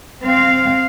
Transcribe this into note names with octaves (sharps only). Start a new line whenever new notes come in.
C4 F5